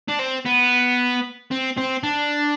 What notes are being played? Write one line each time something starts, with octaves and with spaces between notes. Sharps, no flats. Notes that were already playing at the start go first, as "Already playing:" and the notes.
D4
C4
B3
C4
C4
D4